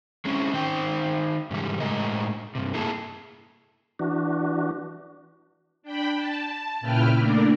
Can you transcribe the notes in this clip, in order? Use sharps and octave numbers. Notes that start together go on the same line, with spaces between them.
G#3 C4 C#4 E4
D#3 C5 G5
G#2 C#3 E3 G3
A2 G#3 A#4 D#5
G2 C3
A3 A#3 E4 G#4 A4
E3 D4 F#4
D4 G5 B5
A5
A#2 C#3 E4 B4 G5 F6
A3 A#3 D4 A#4 D5